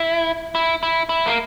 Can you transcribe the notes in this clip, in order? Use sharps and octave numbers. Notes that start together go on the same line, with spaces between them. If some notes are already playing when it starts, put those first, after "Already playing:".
Already playing: E4
E4
E4
E4
A#3